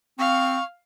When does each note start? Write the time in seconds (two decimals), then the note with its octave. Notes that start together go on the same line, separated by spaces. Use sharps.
0.19 C4 F5 C#6